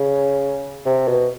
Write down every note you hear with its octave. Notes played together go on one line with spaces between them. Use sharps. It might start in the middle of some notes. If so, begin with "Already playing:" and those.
Already playing: C#3
C3
B2